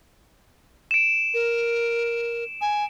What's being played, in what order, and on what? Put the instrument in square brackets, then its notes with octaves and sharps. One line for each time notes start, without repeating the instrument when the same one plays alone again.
[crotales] D7 E7
[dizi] A#4
G#5